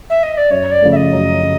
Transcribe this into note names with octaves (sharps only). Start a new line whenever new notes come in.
E5
D#5
D5
F#2 C#5
D5
C#3 F3 A3
E5
D#5
F#2
C#3